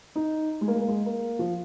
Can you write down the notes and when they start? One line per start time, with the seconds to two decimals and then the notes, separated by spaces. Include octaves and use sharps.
0.16 D#4
0.61 G#3
0.68 A#3
0.75 G#3
0.81 A#3
0.88 G#3
1.06 A#3
1.39 F3